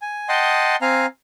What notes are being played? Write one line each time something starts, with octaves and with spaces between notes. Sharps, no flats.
G#5
D#5 F#5 G5 A5 C6 D#6
C4 F5 G#5 A#5